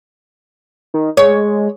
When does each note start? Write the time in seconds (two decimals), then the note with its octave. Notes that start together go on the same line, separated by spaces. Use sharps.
0.94 D#3
1.17 G#3 C#5